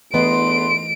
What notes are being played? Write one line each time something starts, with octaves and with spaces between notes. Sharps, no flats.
E2 D3 E3 A3 B3 D#5 C6 D7